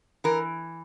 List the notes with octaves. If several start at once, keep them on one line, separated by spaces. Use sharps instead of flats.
E3 A#4